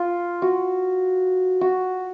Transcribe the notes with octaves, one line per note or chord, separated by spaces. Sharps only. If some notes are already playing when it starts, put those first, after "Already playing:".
Already playing: F4
F#4
F#4